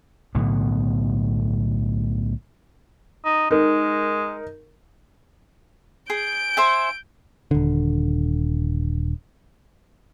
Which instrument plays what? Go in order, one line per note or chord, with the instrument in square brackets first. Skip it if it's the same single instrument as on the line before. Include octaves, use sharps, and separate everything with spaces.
[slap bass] B1 A2 D3 B3
[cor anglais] D#4
[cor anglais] G#3 [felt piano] D#4 A#4
[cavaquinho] G#4 [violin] G6 D7
[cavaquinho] C5 E5 G#5
[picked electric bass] D#1 D3